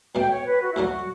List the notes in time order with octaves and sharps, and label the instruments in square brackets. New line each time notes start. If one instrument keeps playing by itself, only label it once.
[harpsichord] C#2 B2 A3 [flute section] G5
[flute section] C#5
B4
F#4
E4
[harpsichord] D2 D3 F#3 A3 [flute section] F#4